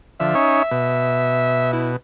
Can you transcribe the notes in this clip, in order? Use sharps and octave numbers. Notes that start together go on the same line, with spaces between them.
D3 F3 E5
C#4 D#4 C#5
B2
E4